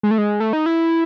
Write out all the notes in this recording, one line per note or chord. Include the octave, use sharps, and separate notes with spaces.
G#3
A3
G#3
A3
D#4
E4